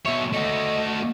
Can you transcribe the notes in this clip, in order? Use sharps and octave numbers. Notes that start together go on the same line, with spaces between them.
B2 C#5 E5
A3 F#4 D#5